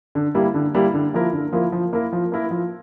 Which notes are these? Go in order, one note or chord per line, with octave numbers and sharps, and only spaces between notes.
D3
G3 A#3 E4
D3
G3 A#3 E4
D3
F3 A#3 E4 A#4
D3
F3 A#3 E4 A#4
F3
A#3 E4 A#4
F3
A#3 E4 A#4
F3